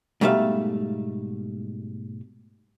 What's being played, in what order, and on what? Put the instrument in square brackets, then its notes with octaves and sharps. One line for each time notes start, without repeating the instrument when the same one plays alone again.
[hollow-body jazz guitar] G#2 B2 G3 A3 E5 F5